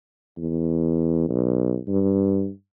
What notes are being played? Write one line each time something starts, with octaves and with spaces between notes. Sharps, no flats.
E2
B1
G2